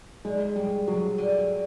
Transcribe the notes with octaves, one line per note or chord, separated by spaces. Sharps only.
D3 G#3
C#3 G3
C#3 F#3
D3